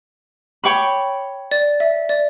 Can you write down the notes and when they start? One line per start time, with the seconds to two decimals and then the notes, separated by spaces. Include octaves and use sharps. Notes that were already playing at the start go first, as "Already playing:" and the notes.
0.64 C#5 G5 B5 D6
1.51 D5
1.80 E5
2.09 D5